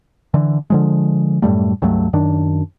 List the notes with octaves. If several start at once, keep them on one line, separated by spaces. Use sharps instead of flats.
D3 E3
D3 F3 G#3
F#2 A2 G3 A3
C#2 G2 F#3 A3
F#2 D#3 D4